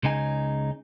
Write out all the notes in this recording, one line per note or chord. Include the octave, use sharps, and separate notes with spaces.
C#2 C#3 D#4 G#5